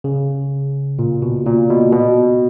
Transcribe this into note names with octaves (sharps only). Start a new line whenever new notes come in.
C#3
A#2
B2
A#2
B2
B2